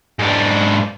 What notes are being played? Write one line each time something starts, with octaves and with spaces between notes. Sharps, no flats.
G#2 D4